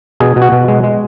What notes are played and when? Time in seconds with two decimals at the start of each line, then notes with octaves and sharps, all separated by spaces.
0.20 B2 G#4
0.36 B2
0.42 F#4
0.52 B2
0.68 G#3
0.84 G#3